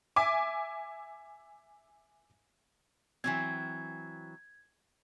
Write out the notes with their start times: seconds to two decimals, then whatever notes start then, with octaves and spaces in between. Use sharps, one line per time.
0.16 E5 G#5 D6
3.24 E3 F#3 C4 G#6